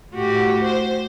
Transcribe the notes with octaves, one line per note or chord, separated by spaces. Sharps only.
A2 F#4 G4
C5